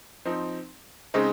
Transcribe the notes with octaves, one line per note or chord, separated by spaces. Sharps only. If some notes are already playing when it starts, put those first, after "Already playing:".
F3 C4 D#4
C#3 G#3 C4 D#4